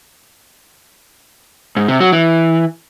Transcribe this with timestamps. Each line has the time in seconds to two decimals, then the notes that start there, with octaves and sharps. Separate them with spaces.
1.77 G#2
1.88 C3
2.00 F#3
2.12 E3